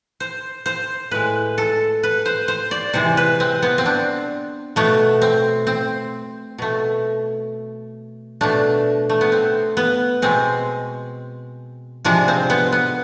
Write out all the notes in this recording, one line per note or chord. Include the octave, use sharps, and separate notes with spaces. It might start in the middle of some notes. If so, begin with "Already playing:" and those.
C5
C5
A2 G#3 B4
A4
B4
C5
C5
D5
C3 E3 G#3 C5
B4
C4
B3
C4
D4
B2 A3 B3
C4
C4
B2 A3
B2 A3 D4
A3
B3
C4
B3
B2 G#3 C4
C3 F3 G#3 D4
C4
B3
B3